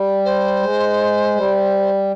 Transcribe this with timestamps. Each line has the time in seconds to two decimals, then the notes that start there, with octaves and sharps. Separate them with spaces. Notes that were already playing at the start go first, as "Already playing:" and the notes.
Already playing: G3
0.25 C5
0.61 G#3
1.35 G3